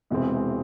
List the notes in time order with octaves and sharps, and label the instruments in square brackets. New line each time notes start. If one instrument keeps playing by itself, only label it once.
[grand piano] E1 E2 C3 G#3 C4